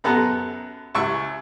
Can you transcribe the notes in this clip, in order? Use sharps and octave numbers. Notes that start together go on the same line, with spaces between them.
F#2 B3 A4 A#5
C#2 E4 C#6 E6